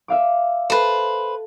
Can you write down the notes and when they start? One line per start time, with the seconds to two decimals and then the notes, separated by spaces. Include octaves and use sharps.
0.08 E5 F5 D6
0.70 A4 B4 C5